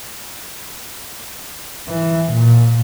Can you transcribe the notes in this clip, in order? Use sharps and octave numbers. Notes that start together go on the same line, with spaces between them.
E3
A#2